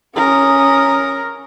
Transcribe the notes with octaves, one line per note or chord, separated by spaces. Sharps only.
C#4 A#4 D#6